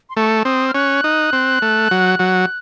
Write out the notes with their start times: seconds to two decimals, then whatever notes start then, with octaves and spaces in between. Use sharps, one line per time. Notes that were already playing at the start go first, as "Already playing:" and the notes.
0.10 C6
0.16 A3 C#6
0.45 C4 D#6
0.68 F6
0.75 C#4 F#6
1.04 D#4
1.33 C4
1.62 A3
1.91 F#3
2.19 F#3